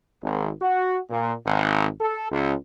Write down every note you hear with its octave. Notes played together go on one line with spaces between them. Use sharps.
G#1
F#4
A#2
G#1
A4
C#2